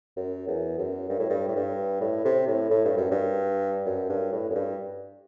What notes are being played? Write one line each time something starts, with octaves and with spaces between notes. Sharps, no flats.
F#2
E2
F#2
G2
A2
G2
A2
G2
A2
C3
A2
A2
G2
F#2
G2
F#2
G2
A2
F#2
G2